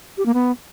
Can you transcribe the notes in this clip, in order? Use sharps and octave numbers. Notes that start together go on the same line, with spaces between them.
G4
A#3
B3